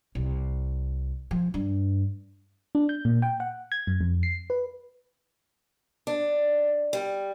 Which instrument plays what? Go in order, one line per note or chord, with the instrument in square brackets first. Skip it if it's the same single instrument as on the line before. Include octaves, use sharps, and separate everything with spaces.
[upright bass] C2
F3
G2
[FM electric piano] D4
G6
A#2
G5
F#5
G#6
F#2
F2
C7
B4
[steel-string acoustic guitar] D4
G3